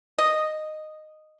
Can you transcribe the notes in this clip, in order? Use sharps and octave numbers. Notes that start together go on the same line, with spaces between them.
D#5